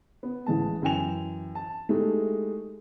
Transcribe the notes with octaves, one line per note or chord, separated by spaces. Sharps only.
B3
A1 E3 G#3 A5
F#2 E3 G5 G#5 F7
A5
G#3 A3 D#4 E4 G4 A4